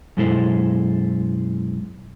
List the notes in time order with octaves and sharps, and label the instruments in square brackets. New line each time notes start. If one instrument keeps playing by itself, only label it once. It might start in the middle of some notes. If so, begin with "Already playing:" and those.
[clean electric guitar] F#2 B2 G#3 E4 A4 C5